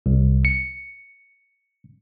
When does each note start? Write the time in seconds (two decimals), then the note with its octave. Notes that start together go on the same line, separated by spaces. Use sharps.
0.06 C2
0.45 C#7